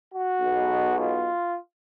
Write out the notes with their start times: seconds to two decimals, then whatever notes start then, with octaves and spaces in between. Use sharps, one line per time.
0.13 F#4
0.41 B1 B2 G#3
0.98 F4